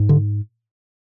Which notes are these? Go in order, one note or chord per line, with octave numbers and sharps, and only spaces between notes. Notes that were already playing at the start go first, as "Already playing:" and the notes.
Already playing: G#2
D3